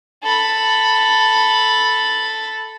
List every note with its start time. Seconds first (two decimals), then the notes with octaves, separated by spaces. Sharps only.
0.23 A4 B5